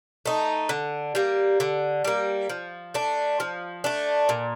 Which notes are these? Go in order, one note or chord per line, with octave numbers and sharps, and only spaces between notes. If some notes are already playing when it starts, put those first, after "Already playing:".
A3 D#4
D3
G3 A#3
D3
G3 A#3
F3
A3 D4
F3
A3 D4
A#2